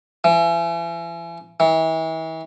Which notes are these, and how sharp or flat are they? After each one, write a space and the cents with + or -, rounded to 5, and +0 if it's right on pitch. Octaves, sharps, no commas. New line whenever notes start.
E3 +40
E3 -35